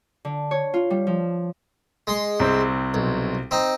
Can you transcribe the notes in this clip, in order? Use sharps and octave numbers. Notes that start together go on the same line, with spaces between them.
D3
C#5
F4
G3
F3
G#3 C6
C2 C4 C5
B1
C4 D#4